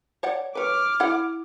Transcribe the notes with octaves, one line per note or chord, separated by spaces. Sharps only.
C#5 D5 F#5
B4 C#5 D6 F6
E4 F#5